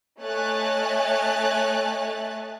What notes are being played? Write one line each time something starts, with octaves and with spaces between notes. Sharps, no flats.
A3 C#5 D#5 G#5 F#6 A6